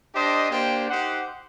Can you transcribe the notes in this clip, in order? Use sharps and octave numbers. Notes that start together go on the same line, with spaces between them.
D4 G4 C5 D#5
A#3 D4 G4 C5 G5
D#4 G4 C5 F#5